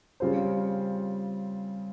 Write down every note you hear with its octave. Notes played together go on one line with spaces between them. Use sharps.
C#3 G3 C4 F4 C5